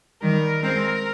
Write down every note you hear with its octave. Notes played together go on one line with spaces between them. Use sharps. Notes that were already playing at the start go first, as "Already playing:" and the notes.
D#3 G3 A#4
G#3 C4 A#4